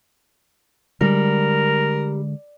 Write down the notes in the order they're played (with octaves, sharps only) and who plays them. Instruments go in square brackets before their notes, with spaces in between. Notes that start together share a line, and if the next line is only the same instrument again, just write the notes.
[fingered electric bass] D3 G#3 [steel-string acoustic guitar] G3 [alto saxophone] A#4